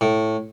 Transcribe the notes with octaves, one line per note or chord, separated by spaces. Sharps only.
A2